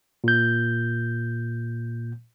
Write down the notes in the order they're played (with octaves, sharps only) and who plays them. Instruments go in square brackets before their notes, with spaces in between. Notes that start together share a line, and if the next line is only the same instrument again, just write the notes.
[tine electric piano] A#2 G6